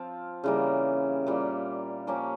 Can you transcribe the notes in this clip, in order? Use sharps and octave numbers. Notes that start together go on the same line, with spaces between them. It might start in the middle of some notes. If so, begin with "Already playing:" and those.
Already playing: F3 C4 F4
C#3 E3 G3 A#3
A#2 G3 A#3
F3 A#3 C#4 G4